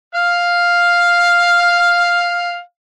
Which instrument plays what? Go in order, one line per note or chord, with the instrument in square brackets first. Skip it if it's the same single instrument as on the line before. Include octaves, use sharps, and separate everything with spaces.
[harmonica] F5 F6